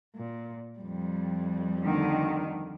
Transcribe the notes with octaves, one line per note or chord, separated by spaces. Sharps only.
A#2
F2 G3
D2 D3 D#3